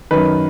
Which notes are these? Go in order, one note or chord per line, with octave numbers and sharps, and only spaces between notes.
F#2 D#3 B4